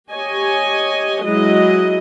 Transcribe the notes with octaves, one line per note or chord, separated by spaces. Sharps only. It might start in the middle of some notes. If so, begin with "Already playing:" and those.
G4 C#5 D#5 G#5
F#3 G#3 E4 D#5